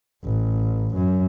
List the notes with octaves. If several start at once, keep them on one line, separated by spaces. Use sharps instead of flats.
A1
F#2